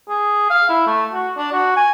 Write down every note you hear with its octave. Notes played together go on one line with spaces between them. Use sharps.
G#4
F5
E4
A3
F#4
D4
F#4
G#5